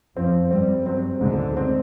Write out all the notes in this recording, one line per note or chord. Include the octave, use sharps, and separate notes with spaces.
F2 F3 C4
G2 G3 C4
F#2 F#3 C4
D2 G#2 D3
C4